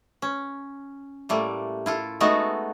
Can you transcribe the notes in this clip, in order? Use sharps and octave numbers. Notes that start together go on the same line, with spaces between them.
C#4
A2 G3 A3 A#3
E4 F4 A4
G#3 A3 B3 D#4 F#4 A4